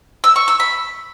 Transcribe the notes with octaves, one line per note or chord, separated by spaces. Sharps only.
E6
C#6
E6
B5